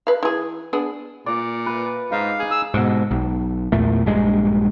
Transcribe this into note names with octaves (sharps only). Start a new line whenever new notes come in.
B4 F5
E3 G#4
B3 D4 G#4
A#2 D5
B4
G#2 D#4 F5
G#4
E6
G#2 B2
B1
E2 A#2 A3
A#1 G2 G#3